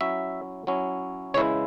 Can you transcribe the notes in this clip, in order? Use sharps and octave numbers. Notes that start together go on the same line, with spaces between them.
F#3 C#4 E4 E5
F#3 C#4 E4
C#3 E3 G#3 E4 C#5